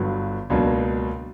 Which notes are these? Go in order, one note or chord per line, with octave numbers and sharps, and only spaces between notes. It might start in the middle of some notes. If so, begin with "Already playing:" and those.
Already playing: G1 G2 F#3
C#2 B2 F#3 A#3 D4